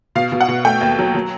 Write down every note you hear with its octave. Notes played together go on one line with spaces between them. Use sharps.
B2 F5
B2
F#5
B2
A3 G5
D#2
F#3
F#3